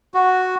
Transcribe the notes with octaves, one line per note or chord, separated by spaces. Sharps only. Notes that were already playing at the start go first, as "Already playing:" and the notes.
F#4